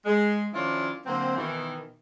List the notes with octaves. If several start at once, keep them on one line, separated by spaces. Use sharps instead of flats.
G#3
D#3 F3 C#4 D4 E4 F4
D3 F#3 A#3 C4
B2 D#3 E3